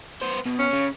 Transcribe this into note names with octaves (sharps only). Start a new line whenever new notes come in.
B3 C5
B2
C#4
C#3